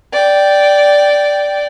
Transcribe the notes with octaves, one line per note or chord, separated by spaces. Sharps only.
D5 G5